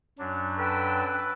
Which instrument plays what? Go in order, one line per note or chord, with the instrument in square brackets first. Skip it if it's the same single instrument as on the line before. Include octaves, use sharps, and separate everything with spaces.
[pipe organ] F#2 F#3 D4
[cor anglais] A4 [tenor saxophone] B4 [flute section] G5 A5